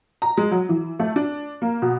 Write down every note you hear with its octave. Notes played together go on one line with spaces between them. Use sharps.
A#5
G#3
F#3
E3
A3
D4
A#3
B2